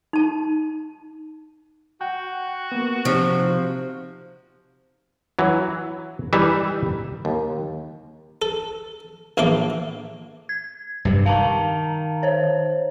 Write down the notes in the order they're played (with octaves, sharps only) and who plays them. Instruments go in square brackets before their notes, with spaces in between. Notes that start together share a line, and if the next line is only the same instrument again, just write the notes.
[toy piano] D#4 A5
[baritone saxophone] F#4 [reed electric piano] F#5 G5
[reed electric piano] A#3 B3
[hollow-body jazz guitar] C3 [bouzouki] F3 [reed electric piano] D#4
[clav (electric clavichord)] E3 F#3
E3 G3 D#4 E5
D#2
[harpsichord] A4
A#1 A2 E3 A#3 A4 D6
[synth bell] G#6
[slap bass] G2 C3
[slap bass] D#3 [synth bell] F5 A5 A#5
[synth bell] C5 C#5